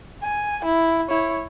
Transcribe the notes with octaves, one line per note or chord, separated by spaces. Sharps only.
G#5
E4
E4 C#5